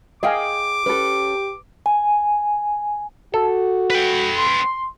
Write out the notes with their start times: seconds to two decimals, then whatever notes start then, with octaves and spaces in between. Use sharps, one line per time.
0.23 G#4 D#5 F5 G5 G#5 D6
0.86 C#4 G4 A4 B4
1.86 G#5
3.34 F#4 A4
3.90 B4 G5
4.37 C6